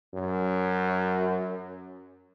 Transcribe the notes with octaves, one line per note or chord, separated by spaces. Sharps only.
F#2